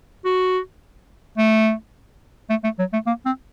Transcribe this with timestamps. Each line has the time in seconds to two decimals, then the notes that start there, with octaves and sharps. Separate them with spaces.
0.25 F#4
1.38 A3
2.50 A3
2.64 A3
2.79 F#3
2.93 A3
3.07 A#3
3.26 C4